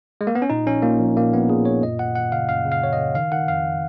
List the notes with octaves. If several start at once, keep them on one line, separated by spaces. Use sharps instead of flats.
G#3
A#3
B3
C#4
A#2 D#4
A#1 C#4
A#2 A#3
A#1
A#2 A#3
A#1 B3
A#2 G#4
A#2 C#5
F#2 D#5
G#1 F#5
G#1 F#5
C#3 F5
F#2 F5
C#3
F5
G#1 C#5
D#5
C#3
D#3 F5
D#3 F#5
F2 F5